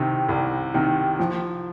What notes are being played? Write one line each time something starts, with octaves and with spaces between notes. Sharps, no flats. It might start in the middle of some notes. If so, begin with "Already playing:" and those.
Already playing: C2 C3 D#3
C2
C3 D#3
F3